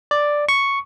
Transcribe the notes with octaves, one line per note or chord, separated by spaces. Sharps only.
D5
C#6